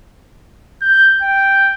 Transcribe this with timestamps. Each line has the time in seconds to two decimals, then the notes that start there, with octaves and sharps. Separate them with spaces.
0.82 G6
1.23 G5